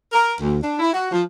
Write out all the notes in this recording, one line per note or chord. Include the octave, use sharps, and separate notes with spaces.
A#4
D2
D4
E4
F#4
F3